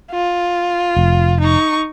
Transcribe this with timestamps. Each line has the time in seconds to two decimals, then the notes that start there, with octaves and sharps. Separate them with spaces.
0.11 F4
0.97 F1
1.41 D#4 C#6